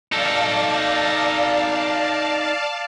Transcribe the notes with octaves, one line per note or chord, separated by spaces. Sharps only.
D#4 A4 D5 F5 A5